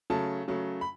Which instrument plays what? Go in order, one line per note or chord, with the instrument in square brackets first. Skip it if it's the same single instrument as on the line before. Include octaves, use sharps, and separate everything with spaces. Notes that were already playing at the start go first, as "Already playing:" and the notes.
[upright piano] C#3 F#3 A3 A5
C#3 F#3 A3
B5